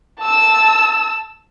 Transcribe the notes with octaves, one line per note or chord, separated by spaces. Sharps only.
A5 E6